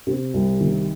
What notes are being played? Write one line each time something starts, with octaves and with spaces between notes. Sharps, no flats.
C3
C2
D#3